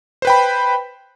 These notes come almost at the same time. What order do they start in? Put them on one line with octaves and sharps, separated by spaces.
C5 B4 G5 B5